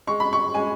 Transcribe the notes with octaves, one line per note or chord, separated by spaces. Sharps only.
G#3 C#6
B5
C#6
G#3 G#5